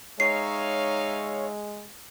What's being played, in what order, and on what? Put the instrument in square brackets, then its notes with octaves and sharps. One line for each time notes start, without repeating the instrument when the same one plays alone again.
[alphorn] G#3 [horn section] D#4 E5 F5 [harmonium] C#5 [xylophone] C7